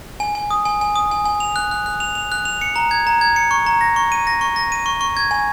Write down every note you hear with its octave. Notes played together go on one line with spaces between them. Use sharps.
G#5
G#5
D#6
G#5
G#5
D#6
G#5
G#5
F7
F#6
F#6
F#6
F7
F7
F#6
F7
C#7
A#5
G#6
A#5
G#6
C#7
C#6
A#5
A#6
C#6
D#7
A#6
C#6
A#6
D#7
C#6
C#6
G#6
G#5